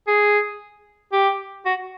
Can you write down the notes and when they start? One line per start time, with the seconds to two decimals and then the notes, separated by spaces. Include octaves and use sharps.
0.07 G#4
1.13 G4
1.66 F#4